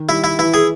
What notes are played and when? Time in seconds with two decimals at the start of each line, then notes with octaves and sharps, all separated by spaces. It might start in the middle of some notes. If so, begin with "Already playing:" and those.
Already playing: D#3
0.08 G3 E4
0.24 E4
0.39 E3 E4
0.54 G#4